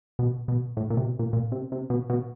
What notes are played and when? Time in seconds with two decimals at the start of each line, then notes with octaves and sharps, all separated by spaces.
0.19 B2
0.48 B2
0.77 A2
0.90 A#2
0.97 C3
1.04 B2
1.19 A#2
1.33 A#2
1.52 C3
1.72 C3
1.90 B2
2.10 B2